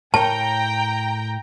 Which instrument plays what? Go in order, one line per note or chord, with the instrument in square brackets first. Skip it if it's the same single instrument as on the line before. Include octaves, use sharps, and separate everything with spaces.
[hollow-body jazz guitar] A2 A#4 C#5 [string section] G5 A#5 [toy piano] A5